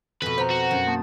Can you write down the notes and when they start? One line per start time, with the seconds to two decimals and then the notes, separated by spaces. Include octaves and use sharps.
0.22 F2 B2 B4
0.38 B3 C5 A#5
0.50 F#4
0.71 F#2
0.87 A#3 A5